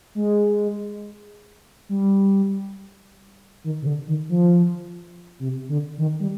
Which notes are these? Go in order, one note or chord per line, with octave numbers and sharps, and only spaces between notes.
G#3
G3
D#3
C3
D3
D#3
F3
C3
D3
D#3
G3